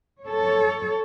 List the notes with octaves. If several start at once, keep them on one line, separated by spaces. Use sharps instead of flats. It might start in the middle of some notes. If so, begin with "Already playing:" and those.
A4 C#5